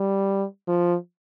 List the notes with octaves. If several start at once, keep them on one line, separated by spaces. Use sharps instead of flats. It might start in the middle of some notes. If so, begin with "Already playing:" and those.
Already playing: G3
F3